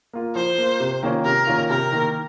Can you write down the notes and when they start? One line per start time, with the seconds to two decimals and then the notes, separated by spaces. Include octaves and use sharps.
0.13 A#3 F4
0.35 F3 C5
0.58 A#3 F4
0.80 C3
1.03 D#3 A#3 C#4 F4
1.25 C3 A#4
1.47 D#3 A#3 C#4 F4
1.70 C3 A#4
1.92 D#3 A#3